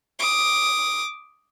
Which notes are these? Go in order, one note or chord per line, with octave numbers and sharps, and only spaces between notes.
D6 D#6